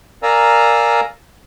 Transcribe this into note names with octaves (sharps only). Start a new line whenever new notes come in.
A#4 D5 F5 G#5 A#5 E6